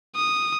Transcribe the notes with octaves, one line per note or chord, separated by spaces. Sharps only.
D#6